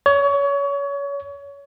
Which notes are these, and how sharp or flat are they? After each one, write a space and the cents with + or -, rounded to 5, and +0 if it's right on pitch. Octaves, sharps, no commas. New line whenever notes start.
C#5 +30